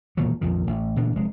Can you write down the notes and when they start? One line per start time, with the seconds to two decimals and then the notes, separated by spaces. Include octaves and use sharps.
0.17 E1 A#2 D#3 F#3
0.41 A#1 F2 A#2 D#3
0.67 A1
0.96 A1 A#2 D3 D4
1.16 F1 G#3